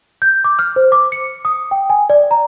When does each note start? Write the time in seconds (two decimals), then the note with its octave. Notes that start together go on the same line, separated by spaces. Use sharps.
0.22 G6
0.44 D6
0.59 F6
0.76 C5
0.92 D6
1.12 C#7
1.45 D#6
1.71 G5
1.90 G#5
2.10 D5
2.31 A#5